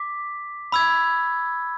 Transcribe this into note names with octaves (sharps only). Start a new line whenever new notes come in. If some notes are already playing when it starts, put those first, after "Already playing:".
Already playing: D6 B6
B5 E6 G#6